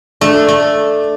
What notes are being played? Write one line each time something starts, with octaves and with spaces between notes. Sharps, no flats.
A3 D4
A3